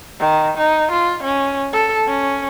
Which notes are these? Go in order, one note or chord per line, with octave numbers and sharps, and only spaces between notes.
D#3
D#4
F4
C#4
A4
C#4